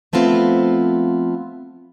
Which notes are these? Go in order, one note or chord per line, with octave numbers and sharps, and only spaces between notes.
F3 A3 B3 C4 F4